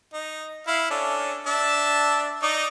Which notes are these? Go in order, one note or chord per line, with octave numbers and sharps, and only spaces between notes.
D#4
E4 F5
C#4 D4 A4
D4 E5 A5
D#4 D5 D#5